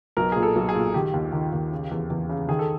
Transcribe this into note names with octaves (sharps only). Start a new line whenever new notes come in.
B1 A#4
A#2 G#4
A4
B1
G#4
A#2
D#3 G4
D#2
D#3
D#2
C#3
E2
E2
C#3
D#3 G#4
A4